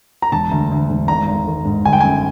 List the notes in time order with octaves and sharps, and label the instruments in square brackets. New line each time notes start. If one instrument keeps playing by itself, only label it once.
[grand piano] A#5
E1 A5
D2
D2
E1
G#1 A#5
G#1
D#3
G#2
G1 G#5
G5
F#2 G#5